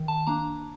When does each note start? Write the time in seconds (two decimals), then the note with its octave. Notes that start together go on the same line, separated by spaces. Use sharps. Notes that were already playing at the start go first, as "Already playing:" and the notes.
Already playing: D#3
0.08 A5
0.27 A#3 D4 A#5